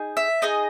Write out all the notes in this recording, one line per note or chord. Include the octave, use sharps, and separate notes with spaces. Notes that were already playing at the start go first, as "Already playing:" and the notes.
Already playing: D#4 G#4
E5
D#4 G#4 D#5